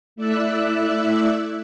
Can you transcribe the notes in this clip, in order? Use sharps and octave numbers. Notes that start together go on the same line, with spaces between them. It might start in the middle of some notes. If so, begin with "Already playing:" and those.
A3 E4 D5 E5 E6 F#6